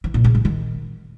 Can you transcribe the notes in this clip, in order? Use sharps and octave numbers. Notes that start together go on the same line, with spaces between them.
E3
A#2
C#3
A2
D#3